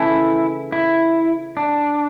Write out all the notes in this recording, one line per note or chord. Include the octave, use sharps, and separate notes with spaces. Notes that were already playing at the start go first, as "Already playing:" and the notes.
Already playing: C#3 E3 A3 C#4 E4
E4
D4